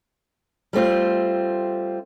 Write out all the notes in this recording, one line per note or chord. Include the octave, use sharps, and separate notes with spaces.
G3 A3 C4 F4